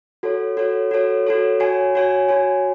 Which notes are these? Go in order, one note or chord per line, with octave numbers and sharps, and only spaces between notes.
F#4 A4 C#5
F#4 A4 C#5
F#4 A4 C#5
F#4 A4 C#5
F#4 C#5 G#5
F#4 C#5 G#5
F#4 C#5 G#5